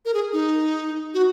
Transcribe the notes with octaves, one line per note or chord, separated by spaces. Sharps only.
A#4
G#4
D#4
F#4